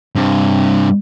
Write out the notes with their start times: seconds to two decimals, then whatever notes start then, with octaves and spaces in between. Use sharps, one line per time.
0.15 G2 C3